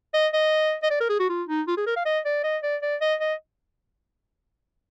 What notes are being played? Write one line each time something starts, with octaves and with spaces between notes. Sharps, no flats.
D#5
D#5
D#5
D5
A#4
G#4
F#4
F4
D#4
F4
G#4
A#4
F5
D#5
D5
D#5
D5
D5
D#5
D#5